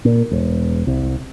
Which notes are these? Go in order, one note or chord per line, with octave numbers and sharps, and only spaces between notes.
A#2
E1
C2